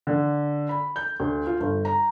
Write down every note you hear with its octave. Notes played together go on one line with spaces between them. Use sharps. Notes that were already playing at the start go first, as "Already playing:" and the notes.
D3
B5
G6
D2
F4
G1
A#5